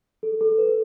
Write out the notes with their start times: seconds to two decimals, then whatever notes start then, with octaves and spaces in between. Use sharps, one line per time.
0.23 A4
0.41 A4
0.58 B4